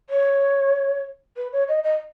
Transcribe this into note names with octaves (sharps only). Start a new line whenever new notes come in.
C#5
B4
C#5
D#5
D#5